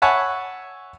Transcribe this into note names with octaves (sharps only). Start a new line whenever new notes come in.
C#5 E5 F#5 G#5 A5 B5